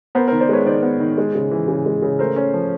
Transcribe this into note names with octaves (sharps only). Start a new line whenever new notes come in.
B3 A#4 C5
A#4 C5
D#3
C5 D5
G#3 B4 C#5
D#3 C5 D5
B3
D#3
G#3
C#3
E3
C#3
G#3
C#3
A3 A#4 C5
C#4
F3